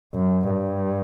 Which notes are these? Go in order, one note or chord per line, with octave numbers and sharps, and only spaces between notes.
F#2
G2